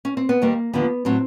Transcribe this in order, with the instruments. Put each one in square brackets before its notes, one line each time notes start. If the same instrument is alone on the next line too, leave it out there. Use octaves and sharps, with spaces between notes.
[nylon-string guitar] C#4
C4
B3
D#2 D#3 G3 A#3
D#2 D3 F3 B3
A2 F#3 C4